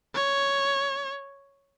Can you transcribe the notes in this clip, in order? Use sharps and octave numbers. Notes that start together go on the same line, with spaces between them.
C#5